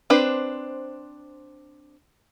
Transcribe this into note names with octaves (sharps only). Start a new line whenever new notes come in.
C4 D4 B4 C5